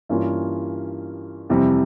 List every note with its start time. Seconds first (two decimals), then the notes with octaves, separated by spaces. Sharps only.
0.09 G2 E3 A#3 C#4 F4
1.50 F2 C3 E3 G3